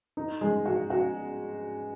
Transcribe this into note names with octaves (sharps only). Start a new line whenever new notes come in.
D#4
G#3
F#4
F#4